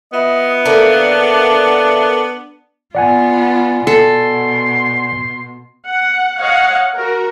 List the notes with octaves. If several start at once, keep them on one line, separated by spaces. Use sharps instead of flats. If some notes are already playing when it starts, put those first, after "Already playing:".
B3 F4 D#5 E5 B5
D3 A#3 D4 E5 F#5
B3 F4 D5 F#5 G#5
B2 A4 C6
F#5
C#5 D#5 F5 F#5
F#4 A#4